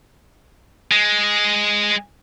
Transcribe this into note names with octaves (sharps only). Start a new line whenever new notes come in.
G#3